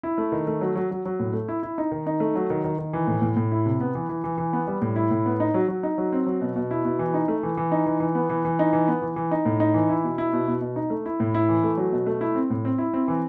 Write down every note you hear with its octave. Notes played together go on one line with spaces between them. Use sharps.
E4
A3
D#3
A3
F#3
F#3
F#3
F#3
A2
A3
E4
E4
D#4
D#3
D#4
A3
F#3
D#3
D#3
D#3
E3
A2
A2
A2
E4
C3
B3
E3
E3
E3
E3
B3
G3
A2
E4
A2
B3
D#4
F#3
F#3
D#4
F#3
C4
F#3
B2
B2
E4
B2
E3
D#4
A3
E3
E3
D#4
E3
E3
B3
E3
E3
D#4
E3
B3
E3
E3
D#4
A2
D#4
E3
E4
B2
E4
B2
B2
B2
D#4
A3
E4
A2
E4
E3
A3
F#3
B2
A3
E4
C4
A2
C4
E4
C4
E3